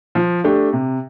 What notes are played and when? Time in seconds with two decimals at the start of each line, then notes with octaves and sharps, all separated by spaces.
0.15 F3
0.44 A3 D4 G4
0.73 C3